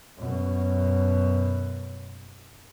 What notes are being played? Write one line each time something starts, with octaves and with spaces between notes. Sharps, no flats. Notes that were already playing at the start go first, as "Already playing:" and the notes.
F#2 B2